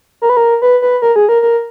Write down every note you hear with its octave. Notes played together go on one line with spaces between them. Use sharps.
A#4
B4
A#4
B4
B4
A#4
G#4
A#4
A#4